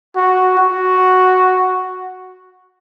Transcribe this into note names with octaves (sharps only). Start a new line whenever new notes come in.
F#4
F#4